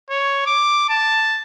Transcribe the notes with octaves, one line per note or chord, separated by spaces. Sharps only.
C#5
D6
A5